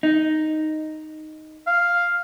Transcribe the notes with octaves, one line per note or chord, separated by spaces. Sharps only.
D#4
F5